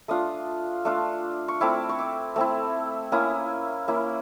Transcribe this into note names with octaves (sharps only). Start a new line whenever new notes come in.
A3 D4 F4 D#6
A3 D4 F4
C#6
A3 C4 E4 D6
C#6
D6
A3 C4 E4
A#3 C#4 E4 D#6
A#3 C#4 E4